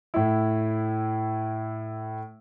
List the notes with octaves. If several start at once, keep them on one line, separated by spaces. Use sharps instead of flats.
A2 E4